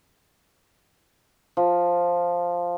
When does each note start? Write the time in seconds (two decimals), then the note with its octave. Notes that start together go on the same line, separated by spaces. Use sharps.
1.57 F3